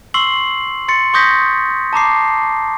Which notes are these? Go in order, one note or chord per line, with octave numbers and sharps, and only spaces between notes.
C6 C#6 E6 C7 F#7
C6 A6 C#7
C6 C#6 D#6 G6 A#6 B6
A5 A#5 D6 C7